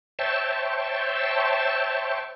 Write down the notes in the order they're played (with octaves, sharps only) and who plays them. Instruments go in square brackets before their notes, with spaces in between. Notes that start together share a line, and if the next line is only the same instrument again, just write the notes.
[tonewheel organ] C5 C#5 E5 G5 A5